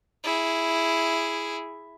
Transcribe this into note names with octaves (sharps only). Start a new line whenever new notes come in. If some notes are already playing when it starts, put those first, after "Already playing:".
E4 G#4